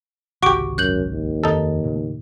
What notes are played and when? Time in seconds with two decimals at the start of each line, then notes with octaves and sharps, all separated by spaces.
0.43 G#1 C#2 C3 F#4 G4 C#6 D6 D7
0.78 F#2 F#6 G6 F#7
1.11 D#2
1.44 F2 D#3 C4 D#4 A4
1.84 A2 C#3